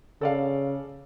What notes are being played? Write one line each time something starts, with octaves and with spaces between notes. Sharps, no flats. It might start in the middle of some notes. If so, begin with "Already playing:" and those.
C#3 A4 D5 F5